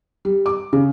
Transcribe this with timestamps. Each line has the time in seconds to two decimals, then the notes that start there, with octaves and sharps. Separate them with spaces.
0.25 G3
0.46 D6
0.73 C#3